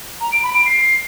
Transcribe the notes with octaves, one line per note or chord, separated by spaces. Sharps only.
A#5
D7
B5
D7
C7